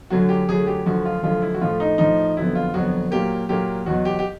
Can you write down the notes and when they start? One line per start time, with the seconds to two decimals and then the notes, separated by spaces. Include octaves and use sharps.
0.10 F#2 D3 F#3 A3 F#4
0.29 G4
0.48 F#2 D3 F#3 A3 G#4
0.67 G4
0.85 F#2 D3 F3 A3 F#4
1.05 F4
1.23 F#2 D3 F3 A3 F4
1.42 E4
1.54 F#4
1.61 A2 F3 A3 F4
1.80 D#4
1.98 A2 F3 A3 D#4
2.37 F2 D3 F#3 B3 E4
2.55 F4
2.74 F2 D3 F#3 B3 F#4
3.11 A#2 F#3 A#3 G4
3.49 A#2 F#3 A#3 G4
3.86 E2 B2 F#3 F#4
4.05 G4
4.19 G4